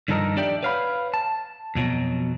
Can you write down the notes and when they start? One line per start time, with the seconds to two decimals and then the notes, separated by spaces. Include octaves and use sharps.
0.08 G2 D#3 F3 A4 A#4 D#5
0.37 D4 G4 D5 E5 G5
0.63 B4 C#5 F5 F#5 B5
1.14 A5
1.75 F2 B2 F3 F#3